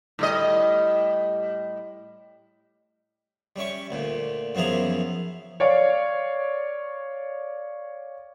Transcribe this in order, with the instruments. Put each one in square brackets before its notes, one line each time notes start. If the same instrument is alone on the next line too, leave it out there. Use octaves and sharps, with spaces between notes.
[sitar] A2 G3 D#5
[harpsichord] G3 C#4 E5 C#6
D2 A#2
F#2 E3 F3 B3 G#4 A#5
[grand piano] C#5 D5 F5